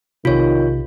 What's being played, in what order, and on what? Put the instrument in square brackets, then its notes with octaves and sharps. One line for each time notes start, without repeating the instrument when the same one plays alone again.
[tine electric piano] B1 C3 [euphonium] D#3 [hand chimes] F4 C#5